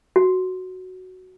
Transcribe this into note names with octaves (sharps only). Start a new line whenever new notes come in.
F#4